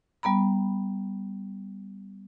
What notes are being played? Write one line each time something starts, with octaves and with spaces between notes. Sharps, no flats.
G3 B3 A#5 B5